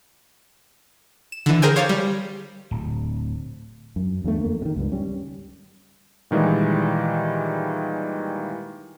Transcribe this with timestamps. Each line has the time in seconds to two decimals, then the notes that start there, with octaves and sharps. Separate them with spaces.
1.32 E7
1.46 D3 E3
1.62 G#4 A#4 C5 G5 G#5
1.76 C5 C#5 F5 D6 F6 A6
1.89 G3
2.71 D1
3.96 F#2
4.24 E2 D3 F#3 A3
4.41 F2 A#3
4.62 C3 D#3
4.76 C#2 G2
4.92 G3 C#4
6.31 A#2 D#3 E3 G3 G#3